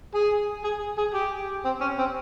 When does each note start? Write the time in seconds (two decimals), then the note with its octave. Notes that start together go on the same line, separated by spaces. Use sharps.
0.14 G#4
0.64 G#4
0.98 G#4
1.14 G4
1.65 C4
1.81 C#4
1.98 C4